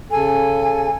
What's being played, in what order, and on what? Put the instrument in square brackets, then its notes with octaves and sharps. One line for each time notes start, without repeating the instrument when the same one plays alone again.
[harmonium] C#3 A4 [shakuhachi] G#5